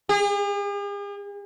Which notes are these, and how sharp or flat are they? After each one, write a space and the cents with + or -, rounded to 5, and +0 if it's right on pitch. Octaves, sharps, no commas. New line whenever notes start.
G#4 -45